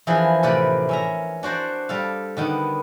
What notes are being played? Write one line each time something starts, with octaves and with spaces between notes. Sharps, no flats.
E3 F3 D4 E4 G#4 A#4
A2 C3 A#4 B4 D5 B5
C#4 E5 A#5
D4 F#4 C5 D5
G3 A4 F5
D3 D#3 B3